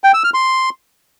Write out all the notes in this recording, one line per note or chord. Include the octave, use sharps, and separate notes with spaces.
G5
E6
F6
C6